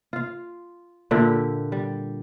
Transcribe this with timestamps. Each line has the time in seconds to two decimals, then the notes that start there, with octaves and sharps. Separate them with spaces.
0.13 F4 F5
1.11 A#2 D3 E4 G4
1.72 G3